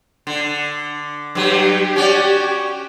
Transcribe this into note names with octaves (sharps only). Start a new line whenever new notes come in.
D3
G2 F#3 G4
C#4 F#4 D5